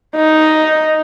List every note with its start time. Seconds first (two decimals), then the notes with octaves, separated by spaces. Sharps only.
0.16 D#4